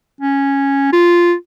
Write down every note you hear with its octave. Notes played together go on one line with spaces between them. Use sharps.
C#4
F4